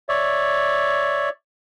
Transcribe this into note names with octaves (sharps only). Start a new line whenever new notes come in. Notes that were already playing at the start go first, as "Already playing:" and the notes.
C#5 D5 E5